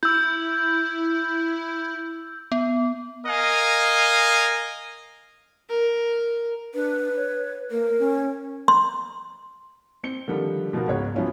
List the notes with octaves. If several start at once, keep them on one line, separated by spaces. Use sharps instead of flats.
E4 E6 G6
B3
A#4 D#5 F5 G#5
A#4
D4 B4
C#5
A#3 A#4
C#4
C6
C4 C#7 G7
D3 D#3 F3 G3
B2 F3 B3 F#4 A#4
C#2 G#2 B3 C#5
F3 F#3 B3 C#4 E4 F4